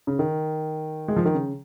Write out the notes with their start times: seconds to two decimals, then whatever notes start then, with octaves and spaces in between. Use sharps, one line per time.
0.07 C#3
0.19 D#3
1.08 G#3
1.16 F3
1.25 D#3
1.34 C#3